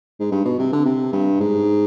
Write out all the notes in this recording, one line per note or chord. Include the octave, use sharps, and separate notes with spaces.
G#2
G2
B2
C3
D3
C3
G2
G#2